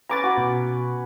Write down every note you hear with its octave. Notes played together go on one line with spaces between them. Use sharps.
C#4 B4 G#5 A#5 D6 A6
F#4 B5
B2